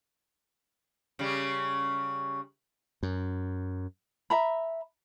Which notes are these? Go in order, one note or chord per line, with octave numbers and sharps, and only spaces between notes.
C#3 G3
F#2
E5 A#5 B5